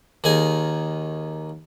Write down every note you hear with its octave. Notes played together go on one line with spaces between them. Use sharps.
D#2 D#3 G#4 G#5